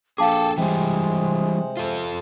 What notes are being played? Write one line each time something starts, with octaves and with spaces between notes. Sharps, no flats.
A#1 G#4 A4 F5 G5 A5 D6
C3 E3 G3 G#3 G5
F4 A4